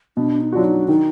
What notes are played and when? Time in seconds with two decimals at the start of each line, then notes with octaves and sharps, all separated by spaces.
0.17 B2 D4
0.41 D#4
0.52 F#3 D4 F4 F#4
0.64 D#4
0.88 D#3 D#4